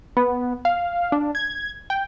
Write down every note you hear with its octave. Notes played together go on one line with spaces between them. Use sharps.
B3
F5
D4
G#6
G5